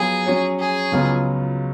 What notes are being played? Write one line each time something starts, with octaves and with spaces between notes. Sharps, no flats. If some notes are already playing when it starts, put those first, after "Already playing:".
Already playing: F#3 B3 F4 G#4
F#3 C#4 F#4 C#5
G#4
C#2 C#3 F#3 B3 F4